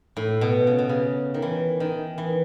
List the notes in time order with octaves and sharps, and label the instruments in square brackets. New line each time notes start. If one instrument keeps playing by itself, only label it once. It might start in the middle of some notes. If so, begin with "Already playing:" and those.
[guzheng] A2
B2
C#3
B2
C#3
D#3
E3
D#3
E3